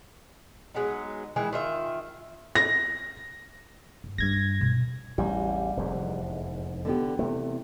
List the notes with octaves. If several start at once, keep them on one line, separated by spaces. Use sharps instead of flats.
F#3 G#3 B3 D#4
D#3 E3 G#3 E4
D#3 F4 E5
A#6
G2
G2 C#4 G#6 A#6
B2
A1 E2 G3
F1 E2 G#2
D3 B3 G4
E2 C3 A3